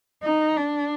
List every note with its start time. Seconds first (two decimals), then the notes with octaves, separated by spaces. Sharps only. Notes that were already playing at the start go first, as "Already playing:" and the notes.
0.23 D#4
0.56 D4